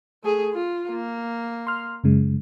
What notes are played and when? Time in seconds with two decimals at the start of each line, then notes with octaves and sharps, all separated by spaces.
0.24 A3 G#4
0.54 F4
0.90 A#3
1.67 C6 F6
2.04 F#2 C#3 G#3